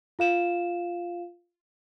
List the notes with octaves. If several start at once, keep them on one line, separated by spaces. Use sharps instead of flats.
F4 F5 E7